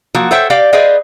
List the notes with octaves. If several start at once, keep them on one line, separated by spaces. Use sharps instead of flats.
F3 F#3 A#3 F#4
A4 C5 C#5 E5 F#5 G5
G4 D5 F5 G5
G#4 B4 C5 D5 D#5 F5